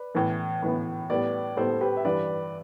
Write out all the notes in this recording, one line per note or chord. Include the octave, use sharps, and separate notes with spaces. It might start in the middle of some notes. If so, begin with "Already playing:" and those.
Already playing: B4 D5
A2 E3 B3
A2 E3 B3
A2 G3 B3 B4 D5
A2 G3 B3 A4 C5
G4 B4
E5
G2 E3 G3 B4 D5